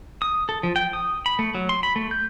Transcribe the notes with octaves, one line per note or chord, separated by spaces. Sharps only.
D#6
A4
F3
G5
D#6
B5
A3
F#3
C6
B5
A3
G6